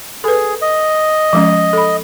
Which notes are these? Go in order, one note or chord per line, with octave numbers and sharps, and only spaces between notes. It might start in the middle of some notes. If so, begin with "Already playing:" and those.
G#4 A4 B4
D#5
F3 G#3 C#4
A4 B5